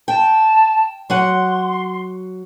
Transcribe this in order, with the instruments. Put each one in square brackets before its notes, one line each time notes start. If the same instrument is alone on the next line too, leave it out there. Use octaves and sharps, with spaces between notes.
[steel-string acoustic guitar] G5 [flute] A5
[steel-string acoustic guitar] F#3 F#5 [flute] C6